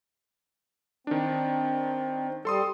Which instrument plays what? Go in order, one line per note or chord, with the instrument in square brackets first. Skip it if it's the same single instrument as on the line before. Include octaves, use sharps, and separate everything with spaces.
[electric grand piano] D#3 D4 [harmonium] C4
[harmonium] G3 [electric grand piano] A4 C6 D#6